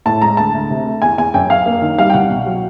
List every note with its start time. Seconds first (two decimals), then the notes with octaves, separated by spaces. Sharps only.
0.06 A2 A5
0.22 G#3 A#5
0.37 D2 A5
0.54 D2
0.70 C3
0.86 A3
1.02 E2 G#5
1.18 E2 G#5
1.34 F#2 G5
1.50 F#2 F5
1.66 A#3
1.82 D#3
1.98 G3 F5
2.10 G5
2.14 C2 F#5
2.31 B2
2.46 F#3